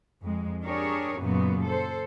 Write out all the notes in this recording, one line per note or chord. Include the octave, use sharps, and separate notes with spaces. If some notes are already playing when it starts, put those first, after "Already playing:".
F2 G#3
D4 G4 G#4 A#4 C#5
F#2 A#2 C#3 F#3 B3
A4 C5